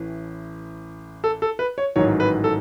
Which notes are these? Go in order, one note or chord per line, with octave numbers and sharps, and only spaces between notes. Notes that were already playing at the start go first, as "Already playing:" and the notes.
Already playing: A1 A2 E3
A4
A4
B4
C#5
A1 G#2 D#3 F#3 C#5
B4
A4